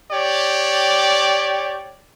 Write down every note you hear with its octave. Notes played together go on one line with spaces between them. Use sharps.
G4 C#5 D5